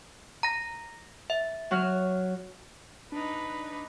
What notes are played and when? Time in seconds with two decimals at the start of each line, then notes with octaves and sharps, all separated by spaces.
0.43 A#5 A#6
1.30 E5
1.71 F#3 F#4 F6
3.12 D4 D#4 B4